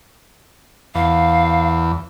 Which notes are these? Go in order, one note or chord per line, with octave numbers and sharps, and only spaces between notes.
E2 F5